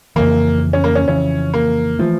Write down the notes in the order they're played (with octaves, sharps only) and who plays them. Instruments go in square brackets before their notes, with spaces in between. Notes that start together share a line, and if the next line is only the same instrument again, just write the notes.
[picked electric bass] F2 C#3 E3 [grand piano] A#3
[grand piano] C#4
A#3
C#4
[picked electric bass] F2 C#3 E3 [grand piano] C#4
[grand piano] A#3
[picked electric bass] E3 A3 [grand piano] F3